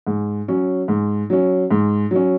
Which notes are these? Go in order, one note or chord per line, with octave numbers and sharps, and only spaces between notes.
G#2
F#3 C#4
G#2
F#3 C#4
G#2
F#3 C#4